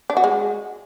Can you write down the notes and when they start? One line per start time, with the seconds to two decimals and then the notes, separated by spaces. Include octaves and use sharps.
0.10 D4
0.17 F#4
0.24 G#3